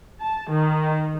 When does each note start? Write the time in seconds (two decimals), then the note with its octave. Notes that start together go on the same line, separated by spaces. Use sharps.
0.21 A5
0.50 D#3